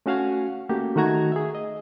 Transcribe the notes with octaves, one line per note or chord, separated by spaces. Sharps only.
A3 C#4 F#4 F5 F#5 G#5
A3 A#3 C#4 F#4 G4
D#3 A3 F#4 A#5 G#6
G#4 E5
D#5